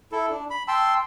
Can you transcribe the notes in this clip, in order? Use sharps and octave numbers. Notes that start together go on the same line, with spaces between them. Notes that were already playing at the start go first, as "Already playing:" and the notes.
E4 A4
D4
B5
G5 A5 C6 E6